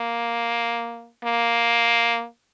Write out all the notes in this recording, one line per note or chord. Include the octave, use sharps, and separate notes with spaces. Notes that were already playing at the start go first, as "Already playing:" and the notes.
Already playing: A#3
A#3